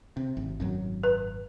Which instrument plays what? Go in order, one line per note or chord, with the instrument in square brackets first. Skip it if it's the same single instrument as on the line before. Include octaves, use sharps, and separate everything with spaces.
[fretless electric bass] C3
G#1
G#1 F#2 F#3
[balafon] B4